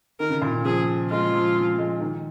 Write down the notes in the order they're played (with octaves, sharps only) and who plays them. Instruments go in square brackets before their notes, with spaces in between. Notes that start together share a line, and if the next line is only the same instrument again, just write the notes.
[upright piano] D#3 [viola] A#4
[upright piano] C#3
A#2
C#3
[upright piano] F3 [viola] G#4
[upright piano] G#3 [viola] F4
[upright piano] F3
F3
F3
G#3
D#3